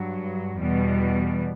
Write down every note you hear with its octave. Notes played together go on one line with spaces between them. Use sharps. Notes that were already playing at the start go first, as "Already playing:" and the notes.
Already playing: G2 F#3
E2 B2 G3